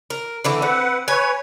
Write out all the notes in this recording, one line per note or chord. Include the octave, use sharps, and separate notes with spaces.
A#4
D3 E3 A3
C4 B4 F#5
B4 C#5 G#5